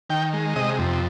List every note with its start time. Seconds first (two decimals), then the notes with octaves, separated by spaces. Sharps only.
0.10 D#3 G5
0.33 G#3
0.56 C3 D#5
0.79 F2